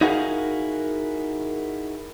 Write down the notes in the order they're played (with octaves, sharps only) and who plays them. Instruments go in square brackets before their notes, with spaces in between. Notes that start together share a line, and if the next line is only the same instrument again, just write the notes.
[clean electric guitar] D#4 E4 F#4 G#4 A#4 F5